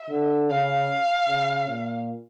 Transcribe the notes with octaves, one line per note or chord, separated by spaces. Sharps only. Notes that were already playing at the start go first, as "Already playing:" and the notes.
Already playing: E5
D3
C#3 F5
C#3
A#2